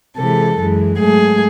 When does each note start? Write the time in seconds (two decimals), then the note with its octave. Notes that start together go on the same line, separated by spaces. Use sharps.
0.17 C3 E3 G#3 A4
0.58 F#2 E3 G#3
0.99 G#2 F#3 A3 G#4